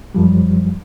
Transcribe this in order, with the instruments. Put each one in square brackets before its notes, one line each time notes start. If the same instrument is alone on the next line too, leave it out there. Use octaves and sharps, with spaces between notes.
[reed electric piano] F#2 F3 G3